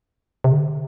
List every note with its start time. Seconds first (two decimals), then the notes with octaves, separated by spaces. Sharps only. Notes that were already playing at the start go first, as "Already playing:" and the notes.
0.44 C3
0.52 D3